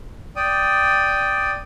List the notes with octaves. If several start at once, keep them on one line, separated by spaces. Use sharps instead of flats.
D5 G5 D#6